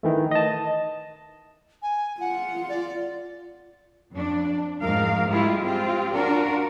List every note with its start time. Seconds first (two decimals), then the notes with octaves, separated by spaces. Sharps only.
0.03 D#3 E3 A3
0.31 D#5 A5
1.82 G#5
2.20 F4 F#5
2.69 D5
4.12 F2 D4
4.82 F2 G#2 A#4 F5
5.29 F3 G3 G#3 E4 F4 G4
5.62 C4 F4 G4
6.14 D4 F4 F#4 A#4